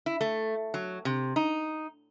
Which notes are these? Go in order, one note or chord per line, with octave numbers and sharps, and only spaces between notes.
E4
A3
F#3
C3
D#4